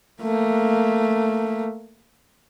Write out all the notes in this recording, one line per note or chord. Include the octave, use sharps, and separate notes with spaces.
A3 A#3